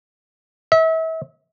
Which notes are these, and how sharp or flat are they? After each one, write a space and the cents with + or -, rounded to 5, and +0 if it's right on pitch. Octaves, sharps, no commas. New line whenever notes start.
E5 -35